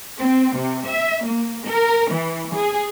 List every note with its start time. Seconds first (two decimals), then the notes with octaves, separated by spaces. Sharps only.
0.19 C4
0.56 C3
0.87 E5
1.25 A#3
1.66 A#4
2.12 E3
2.55 G#4